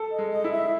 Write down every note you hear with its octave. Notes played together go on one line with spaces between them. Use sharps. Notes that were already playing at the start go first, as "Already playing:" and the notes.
Already playing: A4
D#5
G#3
D#5
E4
E5